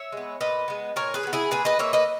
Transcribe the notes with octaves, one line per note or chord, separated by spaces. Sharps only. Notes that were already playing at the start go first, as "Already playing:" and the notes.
Already playing: C#5 E5
G#3 B3
A#2 B4 D#5
G#3 B3
A#2 A#4 C#5
G#4 B4
G#3
B3
E4 G#4
A#2 G#4 B4
B4 D#5
A#3 C#5 E5
B4 D#5